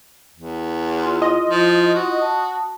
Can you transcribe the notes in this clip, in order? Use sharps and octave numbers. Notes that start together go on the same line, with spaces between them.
E2
E4 F4 C6
D#5
F3
F#4
A5 D#6